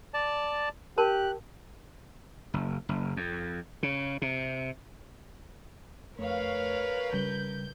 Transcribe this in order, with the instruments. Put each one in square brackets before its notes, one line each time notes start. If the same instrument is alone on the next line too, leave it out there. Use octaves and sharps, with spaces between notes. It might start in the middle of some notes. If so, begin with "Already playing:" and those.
[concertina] D5 A5
[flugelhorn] G4 [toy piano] A#4 A5 [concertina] F#6
[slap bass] F#1
F#1
F2
C#3
C3
[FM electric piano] F2 A3 [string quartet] A#4 B4 [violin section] C#5 F5
[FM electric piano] C#3 [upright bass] G3 [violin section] G6